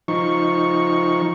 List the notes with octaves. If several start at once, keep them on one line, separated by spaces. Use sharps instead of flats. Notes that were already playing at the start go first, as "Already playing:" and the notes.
F3 D#4 C#6